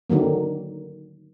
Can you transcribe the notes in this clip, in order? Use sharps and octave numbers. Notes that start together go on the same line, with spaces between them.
D3 D#3 F#3 A#3